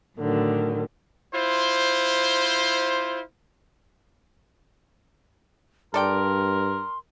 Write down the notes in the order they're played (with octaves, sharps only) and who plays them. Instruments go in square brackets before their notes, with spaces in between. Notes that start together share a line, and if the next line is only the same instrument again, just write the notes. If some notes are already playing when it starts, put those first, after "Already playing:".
[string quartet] A2 D3 D#3 F#3
[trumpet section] E4 F4 C5
[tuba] G2 [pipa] A4 D5 G5 [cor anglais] A#4 [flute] C6